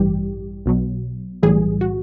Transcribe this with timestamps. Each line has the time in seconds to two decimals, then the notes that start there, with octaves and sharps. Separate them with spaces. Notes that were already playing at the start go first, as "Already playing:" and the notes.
Already playing: A1 G2 E3 G3 G4
0.66 B1 B2 F#3
1.43 B1 A2 E3 G3 G#4
1.81 F#4